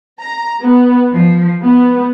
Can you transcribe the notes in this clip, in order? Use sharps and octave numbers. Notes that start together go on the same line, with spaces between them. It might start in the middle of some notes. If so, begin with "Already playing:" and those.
A#5
B3
F3
B3